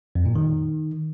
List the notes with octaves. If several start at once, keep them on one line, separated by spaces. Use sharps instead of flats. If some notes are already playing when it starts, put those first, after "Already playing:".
F2
A#2
D#3